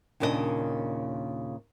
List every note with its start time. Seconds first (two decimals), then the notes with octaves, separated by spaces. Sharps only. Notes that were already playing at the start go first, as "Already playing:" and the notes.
0.20 D#2 A#2 C#3 D4 F#4 D#5